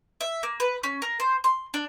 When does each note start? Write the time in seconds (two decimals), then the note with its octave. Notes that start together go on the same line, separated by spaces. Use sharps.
0.21 E5
0.43 A#3
0.60 B4
0.83 C#4
1.02 A#4
1.20 C5
1.44 C6
1.74 D4